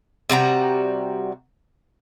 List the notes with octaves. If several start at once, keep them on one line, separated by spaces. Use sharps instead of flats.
C3 G3 F#4 A#5